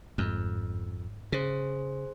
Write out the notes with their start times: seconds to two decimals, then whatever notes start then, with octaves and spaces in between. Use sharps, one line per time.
0.18 G1 F2 G#2 G#3
1.32 C#3 G#4 C5